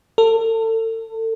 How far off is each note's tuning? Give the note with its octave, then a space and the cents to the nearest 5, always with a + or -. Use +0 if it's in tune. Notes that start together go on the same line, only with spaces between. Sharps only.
A4 +35